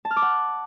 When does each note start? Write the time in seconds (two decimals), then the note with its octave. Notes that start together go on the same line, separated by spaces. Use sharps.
0.05 A5
0.11 F6
0.16 D6
0.22 F#5